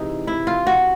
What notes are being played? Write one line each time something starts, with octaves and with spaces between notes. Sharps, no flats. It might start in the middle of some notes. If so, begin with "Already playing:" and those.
Already playing: C3 E3 G#3 D#4
E4
F4
F#4